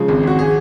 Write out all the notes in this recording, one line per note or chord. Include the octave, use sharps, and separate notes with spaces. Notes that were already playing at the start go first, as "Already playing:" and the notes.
Already playing: C#3 F3 G#3
G#1
G#1 F#4
G#4